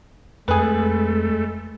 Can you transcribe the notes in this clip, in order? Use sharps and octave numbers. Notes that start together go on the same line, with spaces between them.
F2 G#3 A3 G#4 B4